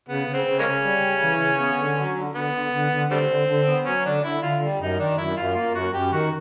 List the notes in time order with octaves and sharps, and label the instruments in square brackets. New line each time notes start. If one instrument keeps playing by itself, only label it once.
[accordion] C#3 [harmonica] B3
[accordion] C#3
[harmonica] C4
[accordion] C#3
[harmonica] G#3 A#3 C#4
[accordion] C#3
G3
C#3
E3
C#3
B3
D3
F#3
D3
[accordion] D3 [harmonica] B3
[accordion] D3
D3
D3
[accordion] D3 [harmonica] G3 A3 C4
[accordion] D3
D3
B3
[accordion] F#3 [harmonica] C#4
[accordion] D3 [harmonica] D4
[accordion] D3 [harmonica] E4
[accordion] D3 [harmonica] F4
[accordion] G3
[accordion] F#2 [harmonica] D#4
[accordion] D#3 [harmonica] D4
[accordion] F#2 [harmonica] E4
[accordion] F#2 [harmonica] F4
[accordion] A#3 [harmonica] F4
[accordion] F#2 [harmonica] F#4
[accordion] F#2 [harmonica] G4
[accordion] D#3 [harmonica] F#4